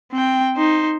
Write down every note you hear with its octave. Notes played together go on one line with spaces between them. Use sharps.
C4 G5
D#4 C5